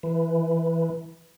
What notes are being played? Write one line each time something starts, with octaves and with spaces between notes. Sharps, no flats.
E3